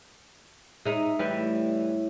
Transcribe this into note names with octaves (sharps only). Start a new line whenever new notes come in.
G#3 D#4 E5
A2 E3 G3 E4